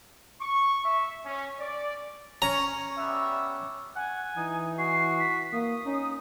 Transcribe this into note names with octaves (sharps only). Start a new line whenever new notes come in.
C#6
E5
C#4
D5
C#4 A#5
G3 B3 E5
F#5 G#5
E3 D#4
F#4 C7
B6
A#3 D#6
C#4 D#4